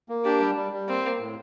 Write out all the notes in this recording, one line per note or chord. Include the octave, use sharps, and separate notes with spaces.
A#3
D4 G4
G3
G3
G3
A#3 C4
A#3
A2